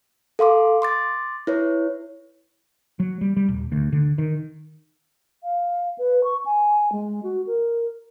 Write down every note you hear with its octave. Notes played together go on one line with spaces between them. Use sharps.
A4 F5 C6 D6
C6 D6 A6
E4 B4 C#5
F#3
G3
G3
D#1
D2
D3
D#3
F5
B4
C#6
G#5
G#3
F#4
A#4